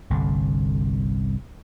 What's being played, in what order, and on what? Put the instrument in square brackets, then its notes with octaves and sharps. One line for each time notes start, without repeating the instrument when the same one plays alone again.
[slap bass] G1 C2 D3